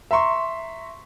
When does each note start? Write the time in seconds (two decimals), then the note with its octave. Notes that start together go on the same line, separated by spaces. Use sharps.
0.11 E5 A#5 C6 C#6